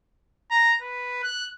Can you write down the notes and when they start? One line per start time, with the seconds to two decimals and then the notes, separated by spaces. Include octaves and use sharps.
0.51 A#5
0.81 B4
1.23 F#6